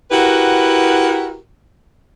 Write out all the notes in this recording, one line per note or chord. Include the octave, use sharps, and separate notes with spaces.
E4 F#4 G4 A#4 B4 F#5